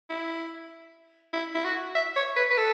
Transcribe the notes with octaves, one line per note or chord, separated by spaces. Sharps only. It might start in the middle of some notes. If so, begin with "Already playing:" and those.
E4
E4
E4
F#4
E5
C#5
B4
B4
A4